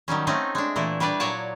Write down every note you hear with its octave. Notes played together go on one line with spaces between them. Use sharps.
D#3 F#3 G3 C#4
A3 C4 C#4 D#4
G#3 D4
A#2 E3 A3 E4
G3 D4 B4 D5
A#2 F#3 C#5 D5 F#5 A5